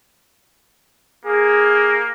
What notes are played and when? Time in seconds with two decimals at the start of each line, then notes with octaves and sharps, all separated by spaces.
1.26 A#3 G#4